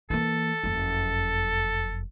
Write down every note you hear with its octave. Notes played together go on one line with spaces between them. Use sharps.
E3 A#3 A4
F#1 F2